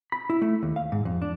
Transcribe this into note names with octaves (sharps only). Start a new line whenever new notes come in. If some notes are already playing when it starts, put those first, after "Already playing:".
B5
E4
A3
D#2
F5
G#2
F2
D4